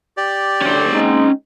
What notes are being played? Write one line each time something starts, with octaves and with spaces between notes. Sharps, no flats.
G4 D5
D2 C#4 G5
G#3 C4 D#4